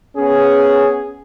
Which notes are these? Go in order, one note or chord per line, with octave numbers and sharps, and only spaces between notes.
B3 C#4 G#4